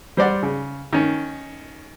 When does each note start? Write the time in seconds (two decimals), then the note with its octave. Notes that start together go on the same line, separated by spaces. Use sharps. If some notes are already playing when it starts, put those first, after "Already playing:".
0.17 G3 C5 D5 F#5
0.43 C#3
0.93 D#3 C#4